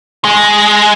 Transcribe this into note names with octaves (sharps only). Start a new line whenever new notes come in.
G#3